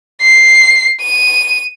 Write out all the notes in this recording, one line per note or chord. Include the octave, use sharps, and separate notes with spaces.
C7
D#7